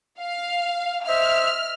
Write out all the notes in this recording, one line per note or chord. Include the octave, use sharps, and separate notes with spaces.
F5
C5 D#5 E5 F6